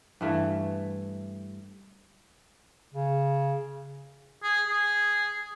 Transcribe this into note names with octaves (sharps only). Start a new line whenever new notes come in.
G2 E3 A3
C#3
G#4
G#4